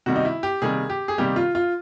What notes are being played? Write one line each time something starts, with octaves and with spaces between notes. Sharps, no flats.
C3 D#3 G3 A#3 F#4
D#4
E4
G4
C3 D#3 G3 A#3 G#4
G4
G#4
C3 D#3 G3 A#3 G4
F4
F4